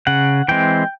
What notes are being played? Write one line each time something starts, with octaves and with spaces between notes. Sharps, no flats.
C#3 F#5
E3 G#3 C4 G5